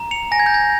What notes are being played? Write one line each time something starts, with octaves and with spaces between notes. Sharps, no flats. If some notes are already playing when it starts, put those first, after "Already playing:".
Already playing: A#5
C#7 F7
G#5 A#6
G#6
G6
G#6